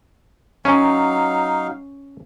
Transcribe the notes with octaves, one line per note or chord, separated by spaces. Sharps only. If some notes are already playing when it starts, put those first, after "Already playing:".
F#3 C#4 D#4 F5